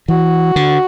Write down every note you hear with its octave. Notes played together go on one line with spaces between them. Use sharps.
E3 F#4
D3